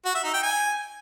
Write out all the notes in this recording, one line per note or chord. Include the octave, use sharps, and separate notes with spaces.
F#4
E5
D#4
G5
G#5